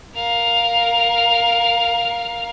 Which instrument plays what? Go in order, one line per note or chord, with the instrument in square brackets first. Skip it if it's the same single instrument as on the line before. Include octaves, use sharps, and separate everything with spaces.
[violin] A#4 F5